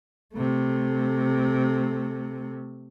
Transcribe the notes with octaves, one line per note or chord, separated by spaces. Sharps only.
C3 A3